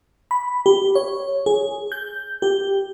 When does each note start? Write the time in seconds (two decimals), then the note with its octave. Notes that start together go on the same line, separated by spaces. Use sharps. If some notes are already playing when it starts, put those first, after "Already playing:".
0.31 B5
0.66 G4
0.95 C#5
1.46 G#4
1.92 G6
2.42 G4